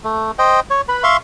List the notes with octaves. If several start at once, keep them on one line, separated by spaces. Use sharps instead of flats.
A3
C5 D#5 G5
C#5
B4 B5
E5 F5 C6 C#6